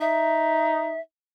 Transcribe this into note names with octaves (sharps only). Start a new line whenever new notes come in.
D#4 E5